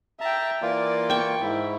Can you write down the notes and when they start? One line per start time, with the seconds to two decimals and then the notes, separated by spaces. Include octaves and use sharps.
0.21 E5 G5 A5 A#5
0.62 E3 A#3 F4 D5
1.10 G5 C#6
1.41 G#2 E4